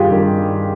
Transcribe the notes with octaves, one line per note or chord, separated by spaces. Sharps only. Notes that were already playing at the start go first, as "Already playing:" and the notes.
Already playing: G2 D#3 F4 G4 G#4
G2 D#3